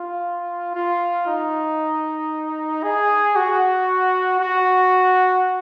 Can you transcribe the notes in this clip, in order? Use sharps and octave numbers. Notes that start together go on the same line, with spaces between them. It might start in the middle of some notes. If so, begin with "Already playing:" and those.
Already playing: F4
F4
D#4
G#4
F#4
F#4